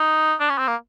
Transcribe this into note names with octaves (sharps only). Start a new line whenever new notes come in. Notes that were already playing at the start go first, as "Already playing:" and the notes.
Already playing: D#4
D4
C#4
C4
A#3